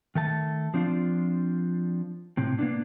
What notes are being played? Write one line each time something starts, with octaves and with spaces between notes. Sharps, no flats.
D#3 A3 A5
F3 C4 D4 F4
A2 C3 C4
A#3 B3 D4